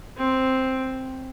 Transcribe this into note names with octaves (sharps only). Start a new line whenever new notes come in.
C4